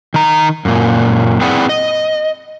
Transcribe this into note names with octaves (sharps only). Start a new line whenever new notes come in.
D#3 A#5
F#2 A#2
C4 E4 G#4 B4 D5 F#5
D#5